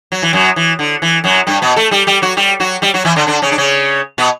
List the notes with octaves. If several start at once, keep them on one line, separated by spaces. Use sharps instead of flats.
F#3
E3
F#2 F#3
E3
D3
E3
F#2 F#3
G2 G3
B2 B3
A3 A4
G3 G4
G3 G4
F#3 F#4
G3 G4
F#3 F#4
G3 G4
F#3 F#4
E3 E4
D3 D4
D3 D4
C#3 C#4
D4
C#3 C#4
B2 B3